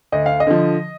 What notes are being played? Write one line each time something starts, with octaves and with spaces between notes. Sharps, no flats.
D2 D#5
F5
D#5
D3 F3